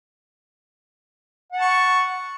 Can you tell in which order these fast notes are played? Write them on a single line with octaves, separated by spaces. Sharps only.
F#5 A5 C#6